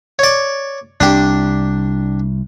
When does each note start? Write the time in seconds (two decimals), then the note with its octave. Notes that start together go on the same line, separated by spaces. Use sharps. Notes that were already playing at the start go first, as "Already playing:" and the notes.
0.19 C#5 D5
1.00 C2 D4 G4